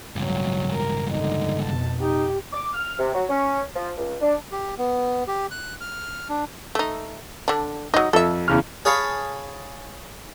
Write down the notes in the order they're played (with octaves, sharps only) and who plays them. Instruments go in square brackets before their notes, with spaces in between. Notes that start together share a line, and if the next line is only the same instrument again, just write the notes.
[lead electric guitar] C#2 G2 [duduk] F#3
[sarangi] A#4
[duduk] D3 [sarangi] D#4
[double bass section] F2 B2 [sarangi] A5
[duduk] D#4 [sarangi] G4
[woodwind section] D6
F6
C3
F#3
C#4
F3
C#2
D4
[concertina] G4
B3
G4
F#6
F6
D4
[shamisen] A3 D#4
D3 D4
[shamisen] F#3 D#4 [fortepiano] D#5
[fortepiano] F2 [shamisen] A4 E5
[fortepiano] E2 C#3 F6
[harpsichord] G#4 C#5 F5 A5 B5